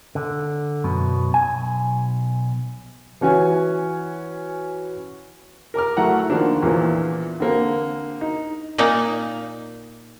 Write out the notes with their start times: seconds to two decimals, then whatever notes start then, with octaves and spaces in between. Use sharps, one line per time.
0.15 D3
0.84 F#2 B2
1.34 B1 G#5
3.21 E3 C#4 F#4 G#5
5.74 A#4 A#5 D6 F6
5.97 F#3 A3 E4 F#5 A#5
6.30 D3 D#3 F3 A#3 D4
6.63 E2 A#2 E3 F3
7.40 D3 A#3 C4
8.21 D#4
8.78 A#2 A#3 D#4